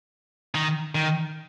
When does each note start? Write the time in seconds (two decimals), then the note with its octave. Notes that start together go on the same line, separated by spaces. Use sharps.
0.55 D#3
0.95 D#3